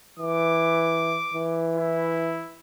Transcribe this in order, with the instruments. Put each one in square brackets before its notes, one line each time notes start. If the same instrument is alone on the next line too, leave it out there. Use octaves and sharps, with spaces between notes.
[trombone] E3 [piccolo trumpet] D6
[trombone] E3
[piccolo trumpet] E4